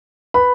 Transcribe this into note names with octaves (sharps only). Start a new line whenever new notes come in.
B4 B5